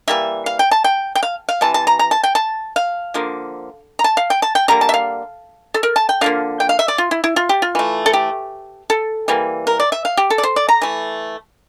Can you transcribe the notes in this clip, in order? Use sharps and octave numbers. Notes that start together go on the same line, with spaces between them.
E3 G3 A#3 E5
F5
G5
A5
G5
G5
F5
F5
C3 E3 A5
A5
A#5
A#5
A5
G5
A5
F5
D3 F3 A#3
A#5
A5
F5
G5
A5
G5
D3 G3 A#3 A#5
A5
E5
F5
A4
A#4
A5
G5
D3 F3 A#3 F5
G5
F5
E5
D5
F4
E4
E4
F4
G4
F4
E3 A3
A4
G4
A4
E3 G3 A#3
A#4
D5
E5
F5
G4
A4
D5
C5
D5
A#5
E3 A3